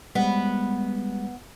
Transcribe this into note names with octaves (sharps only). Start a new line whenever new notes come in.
G3 G#3 B3